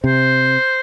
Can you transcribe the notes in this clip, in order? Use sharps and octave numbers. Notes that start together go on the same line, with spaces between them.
C3 C5